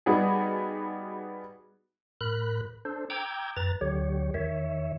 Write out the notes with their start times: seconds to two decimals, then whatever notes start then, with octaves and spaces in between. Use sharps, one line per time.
0.06 G3 B3 D#4 F#4 G#4
2.21 A2 A#4 B5 F#6
2.85 D4 A4 C5
3.10 G5 A#5 D6 E6 G6 G#6
3.57 F#2 B4 A#5 A6
3.81 D2 D3 F#3 G4 C#5
4.34 E2 D#3 C#5 E5